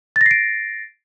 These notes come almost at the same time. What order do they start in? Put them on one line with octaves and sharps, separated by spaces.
A6 A#6 C7 D7